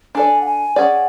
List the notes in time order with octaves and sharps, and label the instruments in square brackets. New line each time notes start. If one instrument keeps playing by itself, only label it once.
[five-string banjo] D4 A4 D5 [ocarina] G#5
[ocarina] F#5
G#5
[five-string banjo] C#4 G#4 D5 [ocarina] F#5